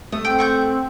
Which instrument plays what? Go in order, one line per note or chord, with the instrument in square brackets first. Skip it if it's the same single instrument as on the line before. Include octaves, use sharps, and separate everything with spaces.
[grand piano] A3 A4 [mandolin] D#6
[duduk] C4 [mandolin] G5
[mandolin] F#5 C#6 G6